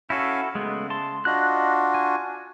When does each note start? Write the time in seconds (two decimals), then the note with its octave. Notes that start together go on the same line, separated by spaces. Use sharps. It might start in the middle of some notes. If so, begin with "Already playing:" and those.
0.10 C#4 E4 F#4 A4 F5 G#5
0.55 C#3 G#3 A3 B3
0.90 A5 C6
1.25 D4 F4 F#4 D#5 F#6
1.94 G#5